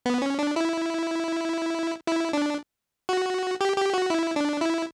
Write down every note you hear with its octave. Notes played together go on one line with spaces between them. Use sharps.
B3
C#4
D4
E4
E4
D4
F#4
G4
G4
F#4
E4
D4
E4